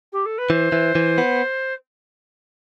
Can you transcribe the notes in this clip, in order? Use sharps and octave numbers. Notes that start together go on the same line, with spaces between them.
G4
A4
B4
E3 C5
E3
E3
B3